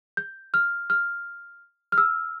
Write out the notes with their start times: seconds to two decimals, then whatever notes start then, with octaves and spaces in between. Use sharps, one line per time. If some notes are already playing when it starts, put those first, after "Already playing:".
0.17 G6
0.54 F6
0.90 F6
1.92 F6
1.98 E6